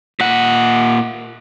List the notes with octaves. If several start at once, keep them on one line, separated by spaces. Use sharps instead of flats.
A#2 F#5